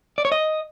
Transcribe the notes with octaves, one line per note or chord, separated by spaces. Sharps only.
D5
C#5
D#5